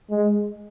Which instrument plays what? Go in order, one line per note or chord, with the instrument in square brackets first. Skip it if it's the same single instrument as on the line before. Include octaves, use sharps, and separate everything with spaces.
[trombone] G#3